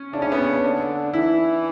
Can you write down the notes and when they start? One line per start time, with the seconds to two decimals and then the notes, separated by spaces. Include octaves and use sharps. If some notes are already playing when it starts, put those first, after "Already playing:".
Already playing: C#4
0.13 C#3 D4
0.22 C#4
0.32 B3
0.41 C#4
0.64 D3 D4
1.13 E3 E4